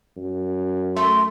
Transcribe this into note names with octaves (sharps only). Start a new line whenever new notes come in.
F#2
A3 C6